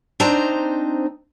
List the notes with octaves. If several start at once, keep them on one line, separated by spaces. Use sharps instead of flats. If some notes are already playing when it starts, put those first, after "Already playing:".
C4 D4 D#4 C5 A#5